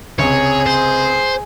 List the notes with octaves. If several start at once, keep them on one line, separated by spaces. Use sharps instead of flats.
C#2 C3 G#4 C#5
C5